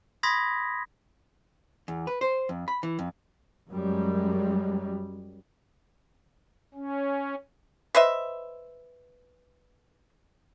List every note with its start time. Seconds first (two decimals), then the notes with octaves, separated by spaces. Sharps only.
0.23 B5 C6 D#6 G#6 A#6 B6
1.88 E2
2.07 B4
2.21 C5
2.49 F2
2.68 B5
2.83 E3
2.99 F2
3.70 F#2 G3 G#3
6.75 C#4
7.95 B4 C5 D#5 E5